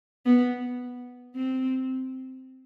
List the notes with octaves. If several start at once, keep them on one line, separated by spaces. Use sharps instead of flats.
B3
C4